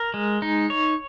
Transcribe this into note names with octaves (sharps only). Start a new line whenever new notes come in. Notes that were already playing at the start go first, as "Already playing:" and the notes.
Already playing: A#4
G#3
D#4
C#5